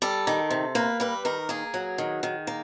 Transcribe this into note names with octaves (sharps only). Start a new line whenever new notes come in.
G3 A4
D#3
C3
A#3 B4
G3 B4
D#3 A#4
A#3 G#4
F#3
D#3
D#3
A#3